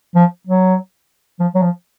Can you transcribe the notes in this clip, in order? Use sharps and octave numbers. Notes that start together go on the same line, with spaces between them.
F3
F#3
F3
F#3
F3